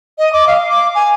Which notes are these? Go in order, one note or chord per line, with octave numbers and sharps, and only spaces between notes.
D#5
D6
F5
D6
G#5